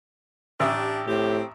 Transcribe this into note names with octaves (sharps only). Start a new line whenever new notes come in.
A1 D4 G4 E5 D#6
A2 C4 G4